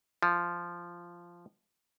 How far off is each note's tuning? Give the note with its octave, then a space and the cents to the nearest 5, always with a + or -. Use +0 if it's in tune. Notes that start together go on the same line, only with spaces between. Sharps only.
F3 -10